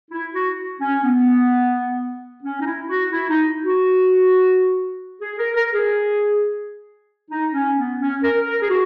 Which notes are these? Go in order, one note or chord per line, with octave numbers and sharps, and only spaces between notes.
E4
F#4
C#4
B3
C#4
D#4
E4
F#4
E4
D#4
F#4
G#4
A#4
A#4
G#4
D#4
C#4
B3
C#4
A#4
A#4
G#4
F#4